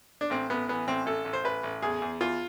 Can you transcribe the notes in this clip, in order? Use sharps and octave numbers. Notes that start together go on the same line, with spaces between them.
D4
A1 C4
A1 B3
E3 B3
A1 C4
A1 A4
A1
C5
A1 B4
A1
E2 G#4
E2
E2 F4